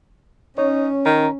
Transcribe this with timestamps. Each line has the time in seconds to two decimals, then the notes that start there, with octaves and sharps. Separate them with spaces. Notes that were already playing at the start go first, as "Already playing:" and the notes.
0.58 C#4 D#4 C#5
1.06 D#3 A#5